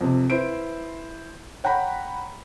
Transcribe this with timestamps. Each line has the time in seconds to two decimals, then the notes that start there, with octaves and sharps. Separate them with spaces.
0.01 F2 C3
0.30 E4 B4 C5 D7
1.64 C#5 F#5 G5 A#5 B5